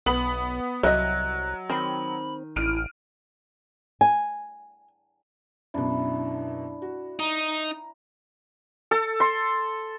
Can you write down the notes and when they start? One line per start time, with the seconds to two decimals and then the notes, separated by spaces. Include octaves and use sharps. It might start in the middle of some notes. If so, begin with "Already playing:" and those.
0.06 B1 B3 B5 F#7
0.83 C2 F#3 D#5 E5 F#6
1.70 D#3 C4 B5
2.56 A1 E4 F6 D7 D#7
4.01 G#5
5.74 F#2 B2 D4 E4
6.82 F#4
7.19 D#4 A#5
8.91 A4
9.20 C6